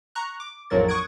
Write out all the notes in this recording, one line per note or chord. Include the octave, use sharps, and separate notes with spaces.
A#5 C#6 F#6
D6
A#1 F2 A2 F#3 A#4 A6
C#6 D#6 F#6 G#6 D7